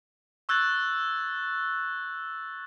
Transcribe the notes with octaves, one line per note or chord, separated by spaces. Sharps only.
C#6 E6 F#6 G#6 A6 F#7